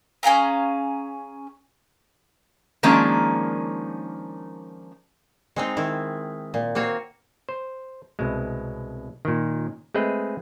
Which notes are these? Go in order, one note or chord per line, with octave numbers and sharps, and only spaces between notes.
C#4 G#4 F5 A#5
D#3 F3 G#3 A#3 C#4 D4
G#3 C4 D#4
D#3 E4
A#2
A#3 C4 F#4 C#5
C5
C2 B2 G#3
A#2 D#3
G#3 A3 C4 G#4 B4 D#5